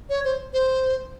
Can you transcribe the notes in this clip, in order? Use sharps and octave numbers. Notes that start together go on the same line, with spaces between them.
C#5
C5
C5